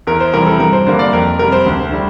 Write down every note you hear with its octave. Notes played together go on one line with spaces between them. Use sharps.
E2 A#4
C5
C3 E3 G3 C4 A#4
A4
G2 A#4
C5
D3 G3 A#3 C5
D5
F2 A#4
C3 G3 A#4
C5
D2
D3 G3